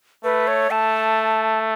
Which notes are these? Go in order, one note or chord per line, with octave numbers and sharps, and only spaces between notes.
A3 B4
C#5
A3 A5